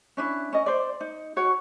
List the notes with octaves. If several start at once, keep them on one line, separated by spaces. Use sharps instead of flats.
C#4 D4 E4
C#4 D#5
C5 D5
D#4
F#4 C#5